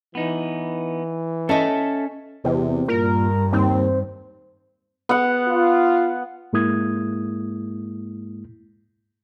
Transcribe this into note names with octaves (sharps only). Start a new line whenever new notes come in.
E3 B3 D#4
C#4 A4 D#5 E5 A5
E2 C3
G2 A#2 A#4
D#2 C4
B3 F#5
F4
G#2 G#3 A#3 E4 D#6 G#6